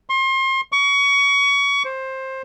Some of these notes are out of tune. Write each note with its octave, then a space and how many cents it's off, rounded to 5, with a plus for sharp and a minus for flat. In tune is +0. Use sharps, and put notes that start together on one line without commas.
C6 +35
C#6 +25
C5 +15